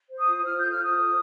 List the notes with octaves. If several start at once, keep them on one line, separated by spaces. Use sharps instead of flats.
C5
D#6
F4
D#6
F4 F6
A4 G6
F6
F4 D#6
C5